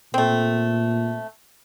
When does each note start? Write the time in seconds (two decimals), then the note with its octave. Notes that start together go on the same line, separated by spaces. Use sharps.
0.14 A#2 A3 C4